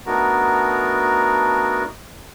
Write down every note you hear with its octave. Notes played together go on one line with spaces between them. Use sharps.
A3 B3 D4 D#4 F#4 A#4